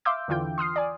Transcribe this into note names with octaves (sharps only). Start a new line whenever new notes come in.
E5 F5 C6 D6 E6 G6
E2 D3 E3 F4 G5 G6
C6 D#6 F6 C7
D5 G#5